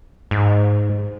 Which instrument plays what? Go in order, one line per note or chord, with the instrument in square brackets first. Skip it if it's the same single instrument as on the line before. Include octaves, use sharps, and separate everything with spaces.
[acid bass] G#2